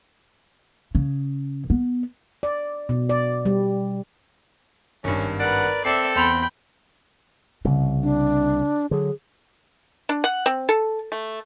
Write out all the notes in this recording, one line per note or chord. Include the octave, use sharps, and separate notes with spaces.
C#3
B3
D5
B2
D5
G3
G#1 G2 C#4
A#4 B4 D5 F#5
C4 A4 D5 E5 C7
E2 G5 B5 C6 F7
C2 C#3
D4
D3 F#3 G#4
D4
F#5
C4
A4
A3